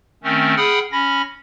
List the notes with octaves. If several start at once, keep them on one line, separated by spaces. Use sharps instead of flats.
D#3 A3 C4 C#4
G#4 F#5 G5 B5 D#6 F6
C#4 B5 A#6